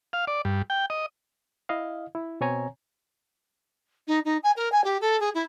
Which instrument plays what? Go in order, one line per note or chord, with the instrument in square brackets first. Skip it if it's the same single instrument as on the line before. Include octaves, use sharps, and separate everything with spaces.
[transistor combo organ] F5
D5
G2
G5
D#5
[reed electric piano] E4 D#5 F5
E4
B2 C4 C#5 G#5 A#5
[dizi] D#4
D#4
G#5
A#4
G#5
G4
A4
G#4
E4